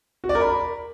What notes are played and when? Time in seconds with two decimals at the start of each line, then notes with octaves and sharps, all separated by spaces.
0.24 F#4
0.29 D5
0.35 A#4
0.41 B5